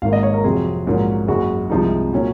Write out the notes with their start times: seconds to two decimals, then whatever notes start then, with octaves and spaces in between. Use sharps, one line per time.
0.02 G#1 G#2 D#3 A#3 F5
0.13 D#5
0.23 C#5
0.34 A#4
0.44 F2 C3 F#3 C4 G#4
0.86 A#1 G#2 F#3 A#3 C#4
1.28 F#1 F#2 C#3 G#3 F#4
1.70 C2 C3 F3 G#3 D#4
2.13 A#2 F#3 C#4